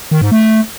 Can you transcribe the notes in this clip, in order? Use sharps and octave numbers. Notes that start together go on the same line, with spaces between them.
D#3
G#2
A3